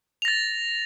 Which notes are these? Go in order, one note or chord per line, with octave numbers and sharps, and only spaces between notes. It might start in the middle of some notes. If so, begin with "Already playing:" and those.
A6 A#6 F7